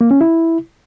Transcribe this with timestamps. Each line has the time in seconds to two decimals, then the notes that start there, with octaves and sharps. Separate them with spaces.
0.01 A#3
0.11 C#4
0.21 E4